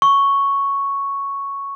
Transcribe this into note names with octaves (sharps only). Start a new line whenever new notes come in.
C#6